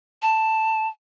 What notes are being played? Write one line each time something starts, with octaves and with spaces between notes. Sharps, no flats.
A5